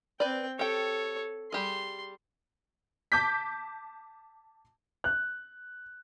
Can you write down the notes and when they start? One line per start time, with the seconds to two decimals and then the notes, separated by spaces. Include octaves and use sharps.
0.20 C4 B4 D5 G5
0.59 G4 A4 C#5 G5
1.52 G3 G4 G#4 C6
3.12 A5 D6 G6 B6
5.04 F#6